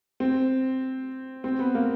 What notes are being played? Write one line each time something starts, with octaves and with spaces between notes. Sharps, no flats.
C4
C4
B3
A#3